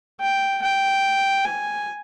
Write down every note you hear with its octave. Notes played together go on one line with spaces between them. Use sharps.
G5
G5
G#5